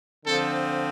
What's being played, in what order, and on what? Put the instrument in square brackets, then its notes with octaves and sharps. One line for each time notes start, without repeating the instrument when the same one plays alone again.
[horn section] D3 F3 C4 A4